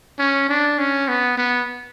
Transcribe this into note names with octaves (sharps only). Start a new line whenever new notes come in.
C#4
D4
C#4
B3
B3